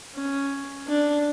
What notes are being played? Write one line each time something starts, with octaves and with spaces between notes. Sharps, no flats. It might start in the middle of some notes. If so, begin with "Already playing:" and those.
C#4
D4